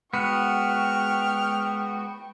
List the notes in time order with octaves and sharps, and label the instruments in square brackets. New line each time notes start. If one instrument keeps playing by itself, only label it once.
[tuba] G#3 [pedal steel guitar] B3 F#4 [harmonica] F#5 F6 [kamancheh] G5 C#6